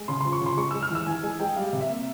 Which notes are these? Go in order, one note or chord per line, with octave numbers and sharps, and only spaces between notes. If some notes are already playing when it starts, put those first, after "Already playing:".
Already playing: G#3
C#3 C6
F3 C6
C#6
C#3 C6
G#3 C#6
G#3 E6
F6
E3 E6
E3 G#5
G#3 G#5
G#3 G5
G3 F5
C3
E5
A#3